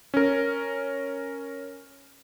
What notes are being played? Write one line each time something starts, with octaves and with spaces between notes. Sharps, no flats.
C#4 A#4